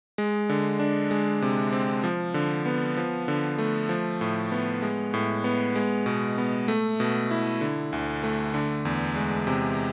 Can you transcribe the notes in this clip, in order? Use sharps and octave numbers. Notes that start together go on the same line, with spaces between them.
G#3
D3
D4
G#3
C3
C4
F3
D3
B3
F3
D3
A3
F3
A2
B3
G#3
A2
B3
G#3
B2
B3
A3
B2
E4
D3
D2
A3
D3
E2
G#3
C3